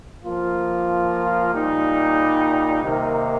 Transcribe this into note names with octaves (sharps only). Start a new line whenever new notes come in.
F3 A#3 F4
A#2 G3 D#4 G4
C3 D#3 A#3 D#4